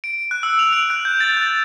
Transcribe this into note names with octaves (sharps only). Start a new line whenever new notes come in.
D7
F#6
E6
F7
D7
F#6
G6
A6
G6